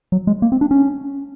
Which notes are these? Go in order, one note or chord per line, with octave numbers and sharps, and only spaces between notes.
F#3
G#3
A#3
C4
D4
C#4